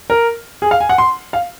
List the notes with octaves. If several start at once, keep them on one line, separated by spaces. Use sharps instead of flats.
A#4
G#4
F5
G#5
F#5
C6
F5